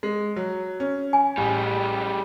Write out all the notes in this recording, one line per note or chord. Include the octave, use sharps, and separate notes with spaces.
G#3
F#3
C#4
G#5
A1 G3 G#3